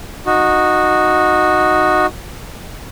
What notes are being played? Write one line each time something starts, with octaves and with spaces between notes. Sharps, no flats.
D#4 F#4